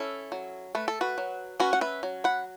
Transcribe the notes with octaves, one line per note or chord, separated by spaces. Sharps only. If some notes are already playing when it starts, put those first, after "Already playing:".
Already playing: C#4 E4 A4
F#3
A3 B4
A4
F#4 B4
F#3
C#4 F#4 B4
F#5
B4 E5
F#3
F#5 B5